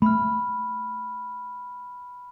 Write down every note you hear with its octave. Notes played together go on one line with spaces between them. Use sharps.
A3 B5 F6